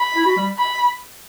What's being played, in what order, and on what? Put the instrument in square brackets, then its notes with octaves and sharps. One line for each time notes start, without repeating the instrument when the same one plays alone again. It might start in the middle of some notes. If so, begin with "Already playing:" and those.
Already playing: [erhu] B5
[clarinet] E4
F#4
G3
[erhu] B5